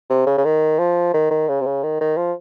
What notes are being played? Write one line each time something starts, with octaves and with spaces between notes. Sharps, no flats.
C3
C#3
C#3
D#3
F3
D#3
D#3
C#3
C3
C#3
D#3
D#3
F3